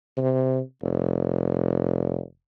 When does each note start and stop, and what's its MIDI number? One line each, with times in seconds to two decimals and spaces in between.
0.17 0.60 48
0.83 2.21 29